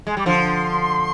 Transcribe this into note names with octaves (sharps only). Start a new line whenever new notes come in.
G#3
G3 D6
D3 F3 C6